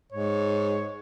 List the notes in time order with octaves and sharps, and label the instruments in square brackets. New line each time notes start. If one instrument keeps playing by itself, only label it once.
[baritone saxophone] G#2 [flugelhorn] C#5